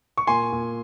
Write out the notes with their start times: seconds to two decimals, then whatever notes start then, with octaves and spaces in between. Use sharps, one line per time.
0.17 C#6
0.27 A#2 G#5 C6
0.52 A#2